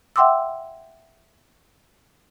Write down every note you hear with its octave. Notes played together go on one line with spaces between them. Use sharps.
E5 F#5 G5 C6 D6 E6